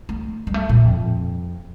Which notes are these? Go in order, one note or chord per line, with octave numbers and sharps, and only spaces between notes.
A3
G3
A3
A#2
F2